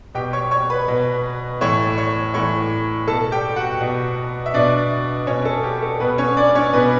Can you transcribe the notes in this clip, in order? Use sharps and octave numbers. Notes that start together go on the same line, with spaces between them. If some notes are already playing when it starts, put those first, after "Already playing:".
B2 G4 G5
C#5 C#6
C#5 C#6
B4 B5
B2
A2 E3 C#5 C#6
C#5 C#6
A2 E3 C#5 C#6
B2 A4 A5
G4 G5
F#4 F#5
B2
E5
B2 D4 D5
B2 C#4 C#5
A4
G4
A4
B2 B3 B4
C#4 C#5
D4 D5
C#4 C#5
B2 B3 B4